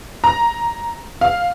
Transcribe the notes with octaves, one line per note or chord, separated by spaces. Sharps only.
A#5
F5